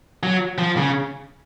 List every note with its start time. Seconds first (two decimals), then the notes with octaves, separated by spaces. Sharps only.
0.23 F#3
0.58 F3
0.77 C#3